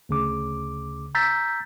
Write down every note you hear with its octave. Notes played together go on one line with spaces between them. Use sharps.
D2 C#3 D6
A#5 E6 G6 A6 B6